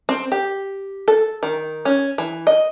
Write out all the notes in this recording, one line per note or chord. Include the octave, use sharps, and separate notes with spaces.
C4
G4
A4
D#3
C#4
E3
D#5